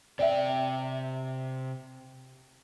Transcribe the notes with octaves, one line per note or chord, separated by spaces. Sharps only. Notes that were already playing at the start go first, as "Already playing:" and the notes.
C3 D5 E5 G5